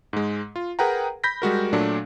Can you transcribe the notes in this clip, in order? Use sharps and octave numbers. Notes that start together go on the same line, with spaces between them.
G#2 G#3
F4
G#4 A#4 B4 F#5 G5 A#5
B5 G6 A#6 B6
G3 G#3 F#4 A#4
A#2 F#3 A3 D4